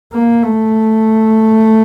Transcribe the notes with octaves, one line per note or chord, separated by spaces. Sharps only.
A#3
A3